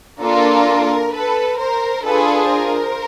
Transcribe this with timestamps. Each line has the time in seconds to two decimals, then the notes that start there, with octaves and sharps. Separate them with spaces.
0.21 A#3 D4 F4 A4 A#4
1.13 A4 B4
1.58 A#4 C5
2.04 D4 F4 G#4 A4 B4
2.51 A#4 C5